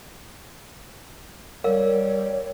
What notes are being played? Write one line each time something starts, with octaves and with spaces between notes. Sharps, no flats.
G3 A#4 C#5 F5